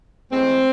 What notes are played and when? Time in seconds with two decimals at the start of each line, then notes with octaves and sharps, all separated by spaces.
0.31 A2 E3 G#3 C4